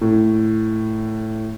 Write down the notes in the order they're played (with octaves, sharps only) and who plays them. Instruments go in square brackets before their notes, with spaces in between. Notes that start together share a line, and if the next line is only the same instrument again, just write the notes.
[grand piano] A2